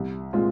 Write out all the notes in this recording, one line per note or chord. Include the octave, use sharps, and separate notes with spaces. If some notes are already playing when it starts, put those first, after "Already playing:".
Already playing: C2
A#2 G#3 C4 F4